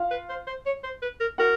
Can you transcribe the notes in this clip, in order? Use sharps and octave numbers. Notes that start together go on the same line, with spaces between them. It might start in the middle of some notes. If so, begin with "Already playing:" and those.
Already playing: F4 F5
B4
C5
C5
C#5
C5
B4
A#4
F#4 A#4 F#5